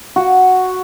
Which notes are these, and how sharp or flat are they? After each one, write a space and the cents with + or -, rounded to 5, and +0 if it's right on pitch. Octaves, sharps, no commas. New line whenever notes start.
F#4 +0